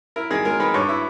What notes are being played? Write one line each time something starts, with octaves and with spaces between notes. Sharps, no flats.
E4 A#4
D#3 G#4
G#3 A#4
D#3 B4
G2 C#5
E4